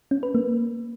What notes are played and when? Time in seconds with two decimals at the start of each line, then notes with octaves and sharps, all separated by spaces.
0.11 C#4
0.23 B4
0.35 A#3